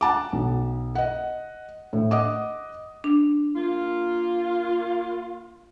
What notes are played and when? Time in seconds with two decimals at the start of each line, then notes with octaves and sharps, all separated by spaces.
0.01 F#5 A5 D6
0.33 B1
0.95 D#5 F#5
1.93 A2
2.11 D#5 F#5 D6 D#6
3.04 D4
3.56 A#3 F4